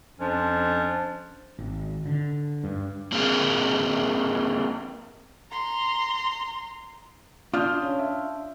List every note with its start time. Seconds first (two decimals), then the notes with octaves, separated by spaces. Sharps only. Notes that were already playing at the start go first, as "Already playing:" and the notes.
0.18 F2 F3 C#4 D4
1.59 G#1
2.06 D3
2.64 G2
3.12 A#3 C4 D4 G#4 A#4 F5
5.51 A#5 C6
7.54 D4 F4 D#6 F6 G6
7.82 C#4
7.99 E5